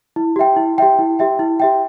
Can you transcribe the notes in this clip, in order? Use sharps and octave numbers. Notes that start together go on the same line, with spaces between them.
E4
G4 E5 G5
E4
G4 E5 G5
E4
G4 E5 G5
E4
G4 E5 G5